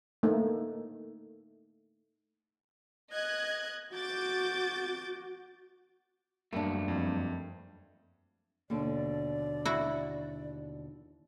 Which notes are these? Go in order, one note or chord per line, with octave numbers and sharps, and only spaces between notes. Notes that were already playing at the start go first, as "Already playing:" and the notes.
A3 A#3 D#4
D#5 F#6 G#6
F#4 D6 G6 A6
F#2 G3 A3 A#3 D4
F2
D#2 B2 D3 D5
E4 F#4